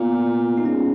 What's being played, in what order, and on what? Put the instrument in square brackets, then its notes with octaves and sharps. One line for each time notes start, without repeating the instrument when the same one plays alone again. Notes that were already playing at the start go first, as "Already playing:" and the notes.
Already playing: [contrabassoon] A#2 [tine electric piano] B3
[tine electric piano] D#4
[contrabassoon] G#2 [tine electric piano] C#4